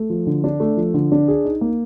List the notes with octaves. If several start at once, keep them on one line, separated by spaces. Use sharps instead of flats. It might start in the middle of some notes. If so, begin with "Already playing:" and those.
Already playing: A3
F3
D3
D4
A3
F3
D3
D4
G#4
D#4
A#3